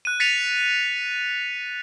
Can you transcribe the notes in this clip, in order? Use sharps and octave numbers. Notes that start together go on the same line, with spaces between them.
F#6 D#7
A6 B6 C#7 D#7 F7